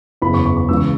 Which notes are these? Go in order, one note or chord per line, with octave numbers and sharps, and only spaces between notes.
F#1 E2 E3 B5
C#6
C#6
C#6
C#2 C#3 E3 E6
C#6